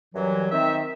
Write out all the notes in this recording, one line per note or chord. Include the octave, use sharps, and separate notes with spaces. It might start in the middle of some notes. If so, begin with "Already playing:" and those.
F#2 E3 F#3 G3
D#3 C4 E5